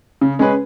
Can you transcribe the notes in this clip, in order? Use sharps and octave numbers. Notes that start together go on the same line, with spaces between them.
C#3
G#3 C#4 G#4 B4